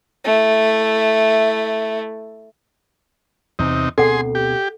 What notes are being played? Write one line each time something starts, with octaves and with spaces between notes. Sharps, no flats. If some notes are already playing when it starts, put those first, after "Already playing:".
A3 E4
E2 C3 D#4
D2 B2 C4 G#4 A4 F#5 C6
G4